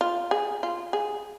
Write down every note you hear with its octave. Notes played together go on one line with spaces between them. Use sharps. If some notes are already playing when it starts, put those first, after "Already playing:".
F4
G#4
F4
G#4